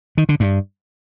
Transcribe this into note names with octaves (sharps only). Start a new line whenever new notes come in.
D#3
D3
G2